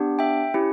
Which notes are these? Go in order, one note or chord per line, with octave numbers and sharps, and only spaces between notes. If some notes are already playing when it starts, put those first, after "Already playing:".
Already playing: B3 D4 G4
E5 G5
C#4 E4 G4